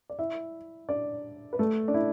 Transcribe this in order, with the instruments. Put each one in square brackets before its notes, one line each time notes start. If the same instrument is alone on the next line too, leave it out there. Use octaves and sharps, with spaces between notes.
[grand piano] D5
E4 E5
D4 D5
B4
A3 A4
D4
E4